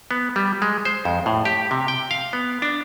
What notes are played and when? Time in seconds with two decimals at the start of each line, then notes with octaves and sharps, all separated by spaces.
0.11 B3
0.36 G3
0.62 G#3
0.85 C5
1.05 F2
1.26 A2
1.45 G4
1.71 C3
1.88 G5
2.11 F5
2.33 B3
2.62 D4